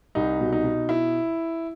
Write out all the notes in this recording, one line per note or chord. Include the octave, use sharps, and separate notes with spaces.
C2 D#4
B2
D#4
B2
E4